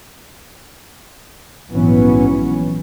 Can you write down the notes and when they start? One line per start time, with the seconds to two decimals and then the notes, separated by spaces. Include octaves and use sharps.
1.69 A#1 G#2 E3 F#3 B3 C#4